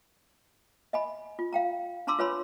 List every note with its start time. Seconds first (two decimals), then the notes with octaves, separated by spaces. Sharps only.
0.93 D#5 G#5 B5
1.39 F4
1.53 F5 G5 A#5
2.07 D4 A5 A#5 C6 D6 E6
2.19 F4 B4 C#5 G#5 B5 C6